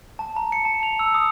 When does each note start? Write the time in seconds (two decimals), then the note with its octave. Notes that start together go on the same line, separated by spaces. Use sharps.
0.19 A5
0.37 A#5
0.52 C#7
0.65 A5
0.83 F7
0.99 E6
1.14 D#6